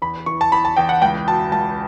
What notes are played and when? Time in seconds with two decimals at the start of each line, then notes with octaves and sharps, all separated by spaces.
0.02 E2 B5
0.26 E3 C#6
0.41 A5
0.52 E2 B5
0.65 A5
0.77 E2 G5
0.89 F#5
1.02 C#2 G5
1.28 B2 A5
1.52 C#2 A5